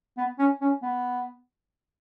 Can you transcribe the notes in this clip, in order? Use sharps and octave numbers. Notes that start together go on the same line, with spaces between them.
B3
C#4
C#4
B3